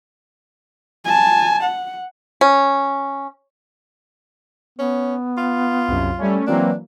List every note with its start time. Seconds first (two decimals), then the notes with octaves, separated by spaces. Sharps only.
1.05 G#5 A5
1.63 F#5
2.41 C#4
4.78 B3 C#4
5.37 F4
5.88 C2 F#2
6.18 G3 A3 C#4
6.47 E3 F#3 A#3 C4 D4